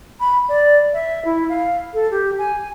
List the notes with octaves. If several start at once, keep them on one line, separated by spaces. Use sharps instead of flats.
B5
D5
E5
E4
F5
A4
G4
G#5